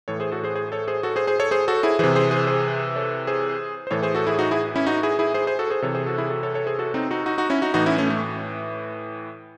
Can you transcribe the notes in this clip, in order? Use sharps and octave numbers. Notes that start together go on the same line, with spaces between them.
A2 E3 A4 C#5
G#4 C5
F#4 A4
G#4 C5
G#4 C5
A4 C#5
G#4 C5
F#4 A4
G#4 C5
G#4 C5
A4 C#5
G#4 C5
F#4 A4
E4 G#4
C3 E3 G#4 C5
G#4 C5
G#4 C5
G#4 C5
A4 C#5
G#4 C5
C5
A2 E3 A4 C#5
G#4 C5
F#4 A4
E4 G#4
D#4 F#4
E4 G#4
C#4 E4
D#4 F#4
E4 G#4
E4 G#4
G#4 C5
G#4 C5
F#4 A4
G#4 C5
C3 E3 A4 C#5
G#4 C5
F#4 A4
E4 G#4
F#4 A4
A4 C#5
A4 C#5
G#4 C5
F#4 A4
C4 D#4
D#4 F#4
D#4 F#4
D#4 F#4
C#4 E4
D#4 F#4
A2 E3 D#4 F#4
C#4 E4
A3 C#4
A3